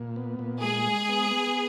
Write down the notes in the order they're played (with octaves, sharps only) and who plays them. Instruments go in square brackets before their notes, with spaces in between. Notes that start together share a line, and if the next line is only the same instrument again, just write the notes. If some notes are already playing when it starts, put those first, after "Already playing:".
Already playing: [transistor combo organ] A#2
B3
A#2
[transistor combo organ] G#3 [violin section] G#4
[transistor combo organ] G#3
B3
B3